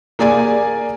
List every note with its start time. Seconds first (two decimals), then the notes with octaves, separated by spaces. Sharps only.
0.19 A#3 G#4 D5 G#5